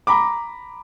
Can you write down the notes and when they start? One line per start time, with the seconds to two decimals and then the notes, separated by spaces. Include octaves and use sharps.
0.07 A#5 B5 D6